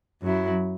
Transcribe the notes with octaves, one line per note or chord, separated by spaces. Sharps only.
F#2 F#3 E4